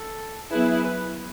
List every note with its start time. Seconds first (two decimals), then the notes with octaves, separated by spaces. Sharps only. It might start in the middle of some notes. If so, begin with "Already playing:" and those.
Already playing: A4
0.51 F#3 B3 E4 G#4 B4
0.84 B4